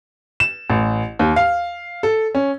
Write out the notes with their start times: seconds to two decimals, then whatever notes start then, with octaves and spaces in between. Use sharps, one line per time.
0.40 E7
0.70 A1
1.19 D#2
1.36 F5
2.03 A4
2.35 C#4